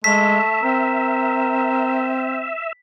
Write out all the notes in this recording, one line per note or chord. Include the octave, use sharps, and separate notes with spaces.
G#3 A3 E5 B6
C4 A#4